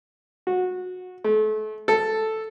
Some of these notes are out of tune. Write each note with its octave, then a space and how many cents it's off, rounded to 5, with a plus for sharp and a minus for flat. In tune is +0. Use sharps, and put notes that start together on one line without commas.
F#4 -20
A3 -35
A4 +0